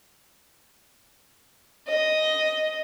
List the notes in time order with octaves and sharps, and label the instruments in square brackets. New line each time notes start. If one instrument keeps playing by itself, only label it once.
[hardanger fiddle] D#5